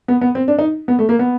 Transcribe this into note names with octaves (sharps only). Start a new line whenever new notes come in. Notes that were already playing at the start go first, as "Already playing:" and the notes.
B3
B3
C4
D4
D#4
B3
A3
A#3
B3